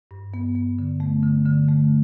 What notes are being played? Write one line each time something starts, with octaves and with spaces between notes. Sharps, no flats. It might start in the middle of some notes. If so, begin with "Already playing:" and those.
G2
B3
B3
D3
A3
D3
D3
A3